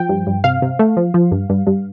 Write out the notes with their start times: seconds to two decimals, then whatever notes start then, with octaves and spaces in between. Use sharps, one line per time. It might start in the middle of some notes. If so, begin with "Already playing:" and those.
Already playing: F3 G5
0.09 G2
0.27 G2
0.44 C3 F5
0.62 C3
0.79 A3
0.97 F3
1.14 F3
1.31 G2
1.50 G2
1.67 G2